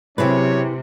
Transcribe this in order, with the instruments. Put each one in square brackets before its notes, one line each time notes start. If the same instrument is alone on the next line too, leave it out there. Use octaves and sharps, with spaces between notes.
[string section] C3 [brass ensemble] F#3 C#4 C#5 [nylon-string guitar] E4 G#4 B4